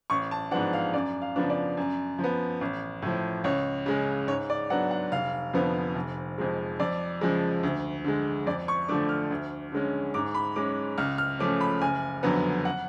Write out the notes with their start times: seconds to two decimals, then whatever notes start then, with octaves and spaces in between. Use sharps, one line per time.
0.10 A1 C#6
0.31 A5
0.51 G#2 F3 B3 D4 F#5
0.73 F5
0.93 F#2 D5
1.22 F5
1.36 C#3 F3 B3 D4
1.50 D5
1.77 F#2
2.19 F3
2.24 B3
2.61 A1
3.02 A2 F3
3.44 C#2 C#5
3.86 C#3 G#3 C#4
4.28 G#2 C#5
4.50 D5
4.70 F#3 B3 D4 F#5
4.91 F#5
5.12 F1 F5
5.54 F2 D3 F3 B3
5.95 F1
6.38 F2 F3 G#3
6.80 F2 D5
7.21 C#3 F3 G#3
7.63 D2
8.04 D3 G#3
8.46 F2 D5
8.68 C#6
8.88 D3 F3 A3 D4 D6
9.09 F6
9.30 D2
9.72 D3 G#3 C#4
10.14 G#2 D6
10.35 B5
10.56 G#3 C#4 D6
10.98 C#2 F6
11.18 F6
11.39 C#3 F3 A3 C#4 D6
11.61 B5
11.81 F#1 G#5
12.23 F2 D3 F#3 B3
12.65 F#5